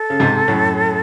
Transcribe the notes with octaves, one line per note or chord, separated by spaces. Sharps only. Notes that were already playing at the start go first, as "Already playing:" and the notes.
Already playing: A4
C#3
G#2 C3
F#2 A2